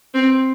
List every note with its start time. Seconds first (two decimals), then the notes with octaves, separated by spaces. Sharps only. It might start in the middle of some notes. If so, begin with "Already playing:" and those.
0.15 C4